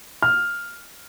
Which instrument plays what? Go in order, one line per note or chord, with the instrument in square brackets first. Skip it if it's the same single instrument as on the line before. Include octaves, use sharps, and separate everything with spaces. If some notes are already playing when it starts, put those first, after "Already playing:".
[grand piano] F6